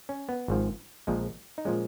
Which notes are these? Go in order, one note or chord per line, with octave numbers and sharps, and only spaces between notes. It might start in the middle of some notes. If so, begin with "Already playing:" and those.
C#4
B3
G#1 G#2 F3
A#1 A#2 F3 G#3
D#4
A#2 F3 G#3 C#4